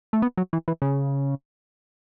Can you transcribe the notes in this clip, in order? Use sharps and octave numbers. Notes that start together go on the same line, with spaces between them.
A3
B3
F#3
E3
E3
C#3